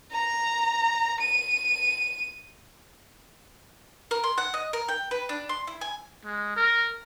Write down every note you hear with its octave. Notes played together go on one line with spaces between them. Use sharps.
A#5
D#7
A#4
C6
F#5
D#5
A#4
G5
B4
D4
C6
E4
G#5
G#3
A#4